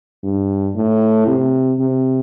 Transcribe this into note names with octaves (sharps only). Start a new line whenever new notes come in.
G2
A2
C3
C3